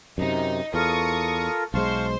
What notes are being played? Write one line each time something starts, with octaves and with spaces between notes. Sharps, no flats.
F#2 C3 D#4
E2 F4 A4 A#4 C#6 D#6
B1 G#3 C5 F5 A5 C#6